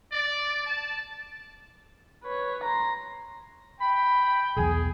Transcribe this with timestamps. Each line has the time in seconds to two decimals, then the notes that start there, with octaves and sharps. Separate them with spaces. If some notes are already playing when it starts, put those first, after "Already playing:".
0.13 D5
0.66 A5
2.24 B4 C#5
2.64 A#5 C6
3.81 G5 B5
4.57 B1 E2 G#4